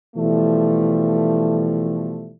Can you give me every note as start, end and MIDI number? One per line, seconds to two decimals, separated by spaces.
0.16 2.32 47
0.16 2.32 52
0.16 2.32 53
0.16 2.32 55
0.16 2.32 57